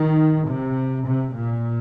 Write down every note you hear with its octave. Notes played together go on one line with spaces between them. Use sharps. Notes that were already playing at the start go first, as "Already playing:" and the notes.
Already playing: D#3
C3
C3
A#2